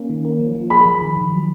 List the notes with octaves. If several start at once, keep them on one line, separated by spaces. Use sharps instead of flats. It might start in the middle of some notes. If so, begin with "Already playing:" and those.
Already playing: A#3 C#4
D#3
A#3
F3
F3
G#4 B5
F3
D#3
D#3
F#3